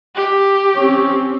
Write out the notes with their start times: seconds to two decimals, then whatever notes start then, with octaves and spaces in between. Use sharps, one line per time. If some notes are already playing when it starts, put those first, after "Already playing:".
0.15 G4
0.76 C4 C#4 C#5